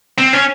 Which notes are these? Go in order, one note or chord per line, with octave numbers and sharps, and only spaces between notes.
C4
C#4